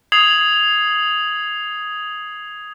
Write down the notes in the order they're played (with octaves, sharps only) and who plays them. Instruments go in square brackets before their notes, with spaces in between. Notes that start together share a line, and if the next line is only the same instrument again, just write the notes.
[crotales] D#6 G#6 C7 F7 F#7